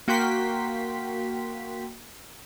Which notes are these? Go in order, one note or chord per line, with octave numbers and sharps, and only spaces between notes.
A#3 F#4 G5 C6 B6